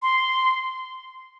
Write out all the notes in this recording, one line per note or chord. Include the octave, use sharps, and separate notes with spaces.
C6